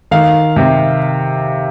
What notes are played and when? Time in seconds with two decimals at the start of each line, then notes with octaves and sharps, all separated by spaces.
0.11 D#3 F5
0.56 C3